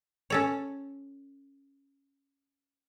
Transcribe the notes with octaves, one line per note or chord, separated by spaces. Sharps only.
C#4 A4 C#5